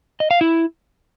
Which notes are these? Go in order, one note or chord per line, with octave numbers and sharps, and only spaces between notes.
D#5
F5
E4